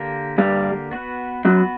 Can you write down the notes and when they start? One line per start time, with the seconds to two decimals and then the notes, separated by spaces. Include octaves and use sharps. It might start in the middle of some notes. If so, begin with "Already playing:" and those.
Already playing: D3 A#3 D4 G4 A#4
0.38 G2 D3 G3 A#3 D4 G4 A#4
0.91 B3 F#4 B4
1.45 F#2 F#3 B3 F#4 B4